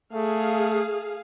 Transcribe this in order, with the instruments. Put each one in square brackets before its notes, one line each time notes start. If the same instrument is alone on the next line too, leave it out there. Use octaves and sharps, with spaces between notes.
[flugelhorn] A3 [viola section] G#4 F5